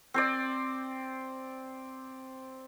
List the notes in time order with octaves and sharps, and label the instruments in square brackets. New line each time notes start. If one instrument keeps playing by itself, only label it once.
[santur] C4 C5 D5